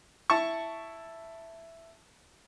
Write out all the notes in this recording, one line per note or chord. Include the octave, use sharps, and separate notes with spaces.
E4 A5 C#6